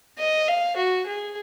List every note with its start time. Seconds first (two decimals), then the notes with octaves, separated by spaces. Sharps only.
0.19 D#5
0.48 F5
0.77 F#4
1.07 G#4